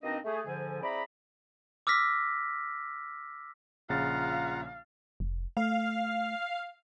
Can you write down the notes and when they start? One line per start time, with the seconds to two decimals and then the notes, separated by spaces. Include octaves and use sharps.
0.03 B2 A#3 C4 D4 D#4 D#5
0.24 A3 G#4
0.46 G#2 D3 F3 G#5
0.82 C4 E4 G#4 D5 A#5 B5
1.87 D6 E6 F6 A#6 B6
3.89 A#1 C#3 F4 F5 F#5 A#5 A6
5.20 F1
5.57 A3 F5